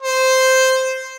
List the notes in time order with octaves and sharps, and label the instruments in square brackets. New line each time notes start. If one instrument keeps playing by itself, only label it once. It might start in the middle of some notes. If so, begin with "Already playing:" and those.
[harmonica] C5